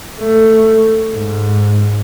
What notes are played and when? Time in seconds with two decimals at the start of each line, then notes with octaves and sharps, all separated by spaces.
0.21 A3
1.14 G#2